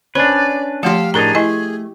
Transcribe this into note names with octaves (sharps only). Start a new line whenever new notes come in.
C#4 D4 B4 C5 D5
F3 A3 G4 A4 F5 C6 D6
A2 D4 D#4 G#4 A#4 A#5
A3 E4 D#5 G#5